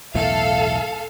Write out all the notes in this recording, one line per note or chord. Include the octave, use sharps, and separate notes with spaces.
B1 E2 A2 A4 E5 F5